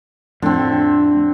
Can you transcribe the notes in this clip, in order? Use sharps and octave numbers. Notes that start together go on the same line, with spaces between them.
F2 A2 D3 C4